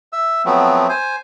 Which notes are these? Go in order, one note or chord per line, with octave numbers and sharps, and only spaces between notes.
E5 E6
F3 F#3 A3 B3 C4
C5 G#5